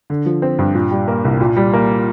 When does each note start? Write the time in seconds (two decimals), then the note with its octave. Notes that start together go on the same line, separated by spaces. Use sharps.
0.10 D3
0.26 F3
0.42 C4
0.59 G2
0.75 A#2
0.91 G3
1.08 A#3
1.25 C2
1.40 A#2
1.57 G3
1.73 A#3